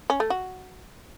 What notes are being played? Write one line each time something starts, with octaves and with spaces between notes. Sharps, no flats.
C#4
A3
F#4